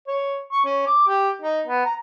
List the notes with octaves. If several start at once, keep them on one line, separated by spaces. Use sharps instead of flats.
C#5
C#6
C#4
D6
G4
D#4
B3
A#5